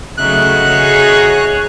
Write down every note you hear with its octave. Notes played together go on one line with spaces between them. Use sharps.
C#3 F#3 A3 D#4 F#4 E5 F#6
G#4 C#5